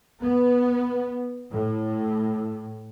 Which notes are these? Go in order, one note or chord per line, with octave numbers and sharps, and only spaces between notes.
B3
A2